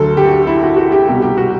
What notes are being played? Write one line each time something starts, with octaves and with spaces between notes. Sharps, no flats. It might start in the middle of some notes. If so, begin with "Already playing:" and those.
Already playing: D2 D3 F#3 A4
G4
F#4
E4
F#4
F#4
G4
C2 B2 G3 G4
G4
F#4